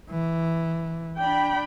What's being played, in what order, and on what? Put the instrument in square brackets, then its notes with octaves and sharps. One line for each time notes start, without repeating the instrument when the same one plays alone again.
[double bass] E3
[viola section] D4 G5 B5